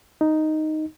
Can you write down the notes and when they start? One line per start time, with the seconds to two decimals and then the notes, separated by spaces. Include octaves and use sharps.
0.21 D#4